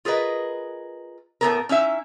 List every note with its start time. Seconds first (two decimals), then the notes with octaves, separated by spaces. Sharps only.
0.05 F4 G#4 A#4 B4 D#5
1.41 A2 A3 B3 A4 A#4
1.69 C#4 D#4 E4 E5